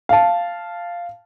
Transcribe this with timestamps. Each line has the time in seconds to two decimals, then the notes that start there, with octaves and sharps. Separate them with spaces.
0.09 F5 A5